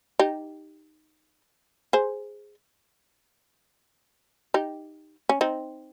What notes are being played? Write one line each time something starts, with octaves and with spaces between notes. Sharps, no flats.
D#4 G4
G#4 C5
D#4 G4
C#4
C4 D#4